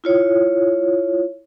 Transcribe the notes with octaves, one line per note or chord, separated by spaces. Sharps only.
E4 F4 C#5